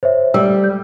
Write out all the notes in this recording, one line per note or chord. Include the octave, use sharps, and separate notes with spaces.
C5 C#5 E5
G3 E6
G6